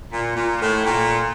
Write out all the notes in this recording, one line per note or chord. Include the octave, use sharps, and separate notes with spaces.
A#2
A#2
A2
A#2